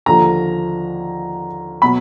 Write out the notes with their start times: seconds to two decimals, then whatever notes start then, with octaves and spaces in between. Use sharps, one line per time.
0.06 D#2 D3 F3 A#5
1.82 B2 F#3 B5